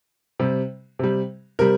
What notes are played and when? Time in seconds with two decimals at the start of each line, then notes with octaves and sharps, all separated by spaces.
0.39 C3 G3
0.99 C3 G3
1.59 C3 G3 A#4